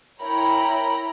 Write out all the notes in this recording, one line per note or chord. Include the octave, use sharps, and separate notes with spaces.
E4 A#4 C#5 G5 A#5 B5